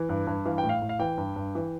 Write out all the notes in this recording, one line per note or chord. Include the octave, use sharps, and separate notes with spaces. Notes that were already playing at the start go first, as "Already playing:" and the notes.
Already playing: E3
G2
G2
E3 F5
G5
A2
F5
A2
F5
E3 G5
G2
G2
E3